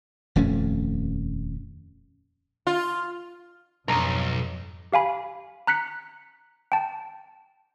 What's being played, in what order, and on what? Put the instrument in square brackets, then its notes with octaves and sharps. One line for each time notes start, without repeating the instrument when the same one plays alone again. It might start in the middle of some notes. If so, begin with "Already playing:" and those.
[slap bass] D#1 F2 A3 C#4
[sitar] F4
[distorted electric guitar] B1 [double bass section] F2 G#2 [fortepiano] A#5
[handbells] G4 F5 G#5 B5
A#5 F#6 B6 C#7
G5 A5